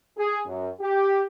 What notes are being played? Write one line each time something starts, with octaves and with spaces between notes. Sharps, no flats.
G#4
F#2
G4